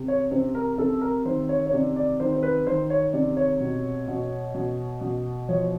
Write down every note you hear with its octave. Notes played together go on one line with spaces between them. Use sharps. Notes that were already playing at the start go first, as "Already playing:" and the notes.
Already playing: C3
C#5
C3 C5
A#4
A#4
C3 A4
A#4
D#3 C5
C#5
C#5
C3 D5
D5
D#3 C5
C5
B4
D#3 C5
C#5
C3 D5
C#5
B2
B2
B2
B2
F3 C#5